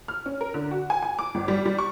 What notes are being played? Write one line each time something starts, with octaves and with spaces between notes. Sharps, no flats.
F6
C#4
A#4
D3
F#4
G#5
G#5
D6
G1
G3
G3
C#6